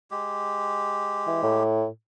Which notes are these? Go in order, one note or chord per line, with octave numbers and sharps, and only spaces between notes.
G#3 G4
E3
A2